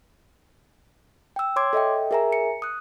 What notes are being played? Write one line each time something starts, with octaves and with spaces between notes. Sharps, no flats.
G5 E6
C#5 C6 D6 G#6
A4 D#5 E5 G5
G#4 A#4 E5 G#5 A#5
C#7
D#6 F#6